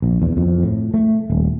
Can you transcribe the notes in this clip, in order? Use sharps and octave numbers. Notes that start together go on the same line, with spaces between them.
A#1
E2
F2
A2
A3
D#1